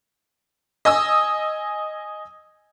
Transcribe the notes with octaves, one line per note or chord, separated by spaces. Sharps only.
D#5 G#5 D#6 E6